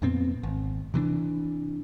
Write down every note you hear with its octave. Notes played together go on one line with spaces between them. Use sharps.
F2 A#2 B3 C4
G#1
C3 E3 C4 D4